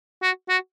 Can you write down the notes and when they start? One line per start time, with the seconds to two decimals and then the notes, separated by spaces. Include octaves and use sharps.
0.22 F#4
0.49 F#4